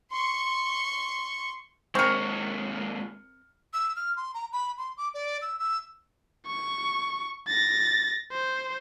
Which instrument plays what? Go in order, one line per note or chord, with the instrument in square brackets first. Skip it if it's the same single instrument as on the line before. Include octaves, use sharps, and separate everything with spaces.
[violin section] C6 C#6
[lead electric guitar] D#2 G#3 [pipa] C4 A#4 [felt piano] C#6 F6 C#7
[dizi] E6
F6
C6
A#5
B5
C6
D6
D5
E6
E6
[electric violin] C#6
A6 A#6
C5